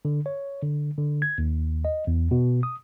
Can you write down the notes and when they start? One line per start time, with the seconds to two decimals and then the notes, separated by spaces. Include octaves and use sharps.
0.05 D3
0.26 C#5
0.63 D3
0.98 D3
1.22 G#6
1.38 D#2
1.85 D#5
2.07 E2
2.31 B2
2.63 D#6